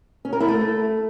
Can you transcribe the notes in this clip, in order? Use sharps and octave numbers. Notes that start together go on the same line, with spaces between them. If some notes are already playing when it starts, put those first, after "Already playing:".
C#4
A#4
E4
A3